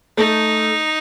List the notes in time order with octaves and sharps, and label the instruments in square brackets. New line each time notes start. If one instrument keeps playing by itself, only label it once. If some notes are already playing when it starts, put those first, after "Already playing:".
[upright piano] A3 [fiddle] D#4